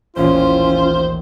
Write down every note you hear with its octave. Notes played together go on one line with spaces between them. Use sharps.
A1 D#2 A#2 C#4 F4 C5